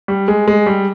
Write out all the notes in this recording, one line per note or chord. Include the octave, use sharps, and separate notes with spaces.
G3
G#3
G#3
G3